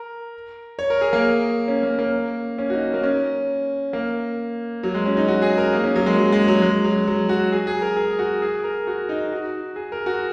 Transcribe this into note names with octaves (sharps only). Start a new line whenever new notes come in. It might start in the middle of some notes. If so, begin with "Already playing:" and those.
Already playing: A#4
C#5
A#4
G#4
A#3
C#4
A#3
A#3
C#4
F#4
D#4
A#3
C#4
A#3
F#3
G#3
C#4
D#4
F#4
G#4
A#4
A#3
C#4
F#3
G#3
F#3
G#3
F#3
G#3
F#3
F#3
F#4
G#4
G#4
A#4
G#4
F#4
G#4
A#4
F#4
D#4
F#4
G#4
A#4
F#4